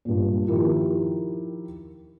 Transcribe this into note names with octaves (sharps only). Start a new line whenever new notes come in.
G2 A#2
D#3 F3 E4 G4 A#4